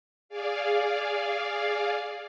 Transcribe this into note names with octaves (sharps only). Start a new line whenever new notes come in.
G#4 D5 F5